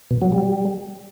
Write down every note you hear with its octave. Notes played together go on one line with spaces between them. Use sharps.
B2
F#3
G3